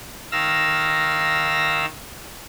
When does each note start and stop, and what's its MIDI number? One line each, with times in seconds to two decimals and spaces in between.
0.32 1.85 51
0.32 1.85 77
0.32 1.85 88
0.32 1.85 94